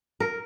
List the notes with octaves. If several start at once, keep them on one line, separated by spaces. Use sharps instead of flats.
A#4